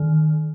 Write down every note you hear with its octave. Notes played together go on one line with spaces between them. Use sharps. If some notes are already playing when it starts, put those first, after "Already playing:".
Already playing: D#3